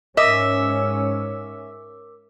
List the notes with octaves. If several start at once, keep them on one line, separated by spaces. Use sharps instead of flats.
G#2 C#4 A#4 D#5 E5 D6 E6